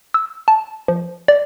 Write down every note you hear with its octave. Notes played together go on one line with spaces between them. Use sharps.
E6
A5
F3
D5